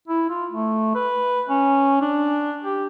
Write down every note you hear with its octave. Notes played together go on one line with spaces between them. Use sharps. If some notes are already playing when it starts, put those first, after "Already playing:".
E4
F4
A3
B4
C#4
D4
G4